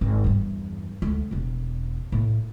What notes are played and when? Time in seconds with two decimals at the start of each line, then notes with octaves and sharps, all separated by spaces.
0.01 G#1
0.24 E2 G2
1.02 D2 G#3
1.31 E1 E2
2.12 A2 A#3